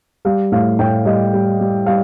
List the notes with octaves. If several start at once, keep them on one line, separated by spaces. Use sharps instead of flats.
G3 F5
A2 F5
A2 G5
G3 D#5
G3
G3
G3 F5